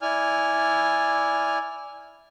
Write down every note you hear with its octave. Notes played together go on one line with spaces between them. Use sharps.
E4 D5 G#5 F6